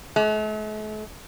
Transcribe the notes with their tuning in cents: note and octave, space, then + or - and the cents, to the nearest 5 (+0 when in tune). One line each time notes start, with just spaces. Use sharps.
A3 -45